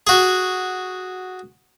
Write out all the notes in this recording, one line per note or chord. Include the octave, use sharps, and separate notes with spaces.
F#4 G#4